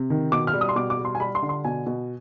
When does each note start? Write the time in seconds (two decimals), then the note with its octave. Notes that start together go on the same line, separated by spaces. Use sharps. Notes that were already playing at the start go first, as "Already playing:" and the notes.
Already playing: C3
0.10 D#3
0.32 B2 D6
0.47 F6
0.53 G3
0.61 D#6
0.69 C6
0.76 B2 D6
0.90 D6
0.98 G3
1.05 C6
1.15 G#5
1.20 G3 B5
1.35 C6
1.42 D3
1.49 C6
1.65 B2 G#5
1.86 B2